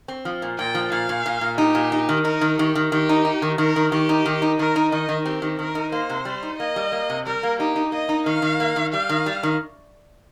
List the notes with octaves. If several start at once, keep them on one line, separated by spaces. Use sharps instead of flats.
C4
F3
A#2
A#2 G5
F3
A#2 F5
A#2
A#2
A#2
D#4 G4
A#2
D#4
D#3
D#4 A#4
D#3
D#3 G4
D#3
D#3 G4
D#4
D#4
D#3
D#3 A#4
D#3
D#3 G4
D#4
D#3
D#4
D#3 A#4
D#4
D#3 D#5
D#3
C4 G4
D#3
D#3 A#4
D#4
A#3 C5
C3
G3
D#4
A#3 D#5
G3
A#3
C3
G3 A#4
A#3
D#4 G4
D#4
A#3 D#5
D#4
D#3 F5
D#3
A#3
D#3
G3 F5
D#3
G3
D#3